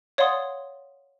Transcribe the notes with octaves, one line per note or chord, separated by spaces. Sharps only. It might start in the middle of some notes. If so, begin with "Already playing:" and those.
C#5 D5 F5 F#5 C6 D#6